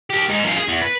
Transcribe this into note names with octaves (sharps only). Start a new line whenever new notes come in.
G4 A#4
G#2 D#4
F#2 F4
G#4
E2
B4